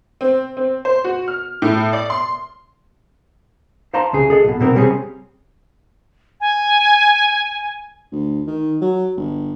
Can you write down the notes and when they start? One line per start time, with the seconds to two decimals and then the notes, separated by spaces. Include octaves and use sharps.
0.21 C4
0.57 C4
0.85 C5
1.04 F#4
1.28 F6
1.62 A2
1.93 D5
2.10 C6
3.94 C5 F5 A5 A#5 C6
4.13 C2 C#3 G#4
4.30 G#4 A4 D#5
4.44 B1 B2
4.60 B1 B2 C4 A#4
4.75 C3 G3 C4 C#4 G#4
6.41 G#5
8.12 D2
8.47 D#3
8.81 F#3
9.17 G1